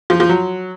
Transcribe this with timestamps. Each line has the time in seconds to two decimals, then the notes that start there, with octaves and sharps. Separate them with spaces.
0.10 F3
0.20 F3
0.29 F#3